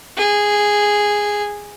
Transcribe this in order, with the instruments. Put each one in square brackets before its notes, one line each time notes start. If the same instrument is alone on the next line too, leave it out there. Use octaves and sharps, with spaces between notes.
[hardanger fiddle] G#4